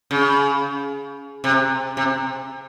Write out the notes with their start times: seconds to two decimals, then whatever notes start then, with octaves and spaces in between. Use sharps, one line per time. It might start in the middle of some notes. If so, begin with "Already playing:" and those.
0.11 C#3
1.44 C3
1.97 C3